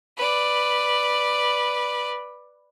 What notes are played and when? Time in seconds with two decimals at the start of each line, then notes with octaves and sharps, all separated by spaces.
0.17 B4 D5